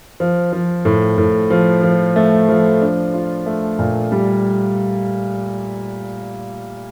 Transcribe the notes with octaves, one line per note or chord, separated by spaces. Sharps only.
F3
F3
A2
A2
F3
F3
A3
F3
D4
F4
A3
A#2
G3